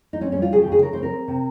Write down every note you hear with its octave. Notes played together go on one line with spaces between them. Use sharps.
D#4
C4 C#4
G3 C#4
F4
C#3 G#4
G4
C#3 G#4
C#3 A#4
C4 C5
A#4
C4
C3